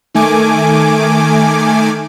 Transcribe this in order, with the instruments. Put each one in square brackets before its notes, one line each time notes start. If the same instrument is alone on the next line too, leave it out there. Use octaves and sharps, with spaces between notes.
[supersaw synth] D#3 A3 G#5 D6